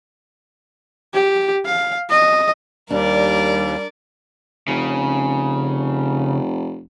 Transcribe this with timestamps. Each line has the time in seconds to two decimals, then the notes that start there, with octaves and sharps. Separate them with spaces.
1.14 G4
1.65 F5
2.09 D#5
2.90 D#2 G3 D4 A#4 D5
4.68 F1 C#3